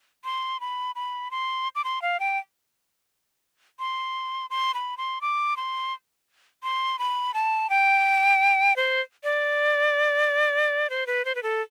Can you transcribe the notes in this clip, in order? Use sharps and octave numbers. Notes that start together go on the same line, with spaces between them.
C6
B5
B5
C6
D6
C6
F5
G5
C6
C6
B5
C6
D6
C6
C6
B5
A5
G5
C5
D5
C5
B4
C5
B4
A4